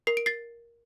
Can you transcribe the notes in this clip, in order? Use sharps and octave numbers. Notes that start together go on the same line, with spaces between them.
A#4 C7
D7
A6 C7